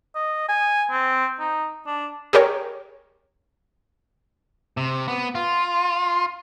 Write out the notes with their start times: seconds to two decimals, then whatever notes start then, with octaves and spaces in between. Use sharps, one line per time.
0.15 D#5
0.49 G#5
0.91 C4
1.40 D#4
1.87 D4
2.33 G4 G#4 A#4 C#5
4.77 C3
5.08 B3
5.35 F4